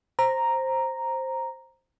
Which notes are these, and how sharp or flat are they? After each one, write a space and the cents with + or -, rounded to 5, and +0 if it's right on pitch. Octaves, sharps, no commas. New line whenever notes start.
C5 +10 A#5 +0